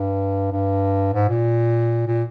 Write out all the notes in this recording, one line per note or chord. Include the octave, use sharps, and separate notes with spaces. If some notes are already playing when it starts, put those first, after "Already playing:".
Already playing: G2
G2
G#2
A#2
A#2